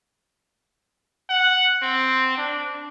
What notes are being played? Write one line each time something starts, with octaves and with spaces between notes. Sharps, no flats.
F#5
C4
D4